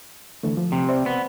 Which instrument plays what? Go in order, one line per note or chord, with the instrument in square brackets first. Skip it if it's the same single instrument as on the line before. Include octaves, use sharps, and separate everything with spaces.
[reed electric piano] D3 E3 A3
F3
[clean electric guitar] C3
[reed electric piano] C5 D5 E5
[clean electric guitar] B3